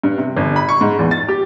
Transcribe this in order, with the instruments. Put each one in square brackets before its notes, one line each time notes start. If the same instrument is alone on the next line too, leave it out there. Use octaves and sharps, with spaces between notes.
[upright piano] G2
C3
G1
B5
C#6
G#2
E2
A6
G4